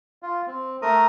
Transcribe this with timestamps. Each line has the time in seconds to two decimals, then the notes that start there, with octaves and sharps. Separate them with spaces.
0.22 F4
0.47 C4
0.82 A3 A#4 A#5 D#6